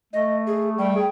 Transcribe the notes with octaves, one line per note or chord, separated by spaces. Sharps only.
A3 D#5
G#4
G3 G5
G#4